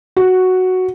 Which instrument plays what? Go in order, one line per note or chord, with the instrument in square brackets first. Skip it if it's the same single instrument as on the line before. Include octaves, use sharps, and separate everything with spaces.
[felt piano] F#4